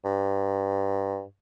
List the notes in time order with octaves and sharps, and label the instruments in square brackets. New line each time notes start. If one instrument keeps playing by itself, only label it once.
[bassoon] G2